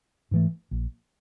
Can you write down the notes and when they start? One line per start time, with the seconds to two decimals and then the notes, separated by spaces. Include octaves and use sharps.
0.31 G#2 E3 A3
0.71 A#1